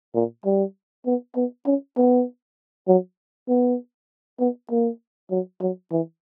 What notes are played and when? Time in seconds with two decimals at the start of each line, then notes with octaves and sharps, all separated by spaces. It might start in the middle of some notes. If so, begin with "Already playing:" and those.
0.14 A#2
0.45 G3
1.06 B3
1.36 B3
1.66 C#4
1.97 B3
2.88 F#3
3.48 B3
4.40 B3
4.71 A#3
5.31 F#3
5.61 F#3
5.91 E3